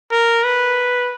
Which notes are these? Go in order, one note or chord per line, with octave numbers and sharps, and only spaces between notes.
A#4
B4